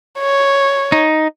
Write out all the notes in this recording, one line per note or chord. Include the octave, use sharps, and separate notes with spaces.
C#5
D#4